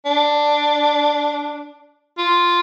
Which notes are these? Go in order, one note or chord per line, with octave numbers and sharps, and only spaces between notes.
D4
F4